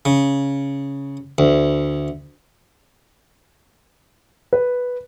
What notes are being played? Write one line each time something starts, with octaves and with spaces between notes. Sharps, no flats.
C#3
D2
B4